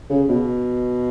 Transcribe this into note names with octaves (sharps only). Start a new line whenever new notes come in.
C#3
B2